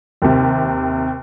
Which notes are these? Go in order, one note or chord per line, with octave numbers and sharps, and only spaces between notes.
D#2 C3